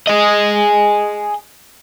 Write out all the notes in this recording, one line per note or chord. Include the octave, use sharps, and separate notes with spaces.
G#4 D#5